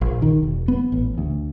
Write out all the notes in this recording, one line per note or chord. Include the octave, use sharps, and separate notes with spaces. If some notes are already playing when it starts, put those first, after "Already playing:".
A#1
D#3
E1
B3
A1
D2